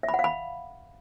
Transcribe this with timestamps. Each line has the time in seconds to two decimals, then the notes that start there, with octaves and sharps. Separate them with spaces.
0.03 E5
0.09 B5
0.14 F#5
0.19 F5
0.24 B5